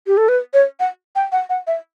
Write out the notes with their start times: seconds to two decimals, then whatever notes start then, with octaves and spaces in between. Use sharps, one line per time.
0.07 G4
0.17 A4
0.29 B4
0.54 C#5
0.80 F#5
1.16 G5
1.32 F#5
1.50 F#5
1.67 E5